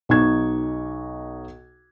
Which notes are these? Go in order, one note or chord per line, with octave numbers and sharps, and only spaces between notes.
B1 D#4 C#6 G#6